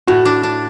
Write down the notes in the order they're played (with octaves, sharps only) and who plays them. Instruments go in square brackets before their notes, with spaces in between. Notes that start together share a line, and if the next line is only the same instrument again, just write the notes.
[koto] A2 [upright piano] F#4
[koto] D4
D4